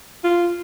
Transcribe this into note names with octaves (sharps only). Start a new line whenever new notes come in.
F4